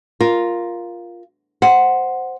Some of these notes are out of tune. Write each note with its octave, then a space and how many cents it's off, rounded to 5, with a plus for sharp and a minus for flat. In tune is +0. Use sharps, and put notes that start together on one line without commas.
F4 +0 A#4 +5
C5 -5 F#5 +0